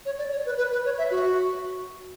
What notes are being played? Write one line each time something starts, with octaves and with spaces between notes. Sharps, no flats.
C#5
D5
C#5
B4
B4
B4
C#5
E5
F#4